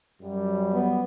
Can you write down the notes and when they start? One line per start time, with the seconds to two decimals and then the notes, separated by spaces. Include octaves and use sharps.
0.21 F#2 G3
0.73 B3